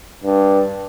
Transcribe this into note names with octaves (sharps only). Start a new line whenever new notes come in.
G2